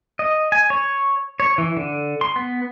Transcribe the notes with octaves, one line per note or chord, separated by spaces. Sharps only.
D#5
G#5
C#5
C#5
E3
D3
C6
B3